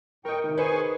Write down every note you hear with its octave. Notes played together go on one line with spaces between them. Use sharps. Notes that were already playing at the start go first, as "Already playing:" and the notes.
A2 A#4 D#5 G5 C#6
C3 D#3
G#4 B4 C5 G#5 C#6